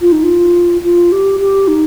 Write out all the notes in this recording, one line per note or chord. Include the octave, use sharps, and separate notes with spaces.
F4
D#4
F4
F4
G4
G4
D#4